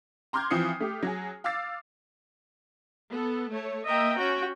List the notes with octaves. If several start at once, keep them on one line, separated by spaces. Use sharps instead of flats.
A#5 C6 D6 F6 G6 G#6
E3 F3 C4 D#6 C7 C#7
A3 G4
F#3 G#4
F5 D6 E6 A6 C7
B3 A4
A3 C#5
A#3 D#5 E5 G5 A#5
C#4 F#4 G5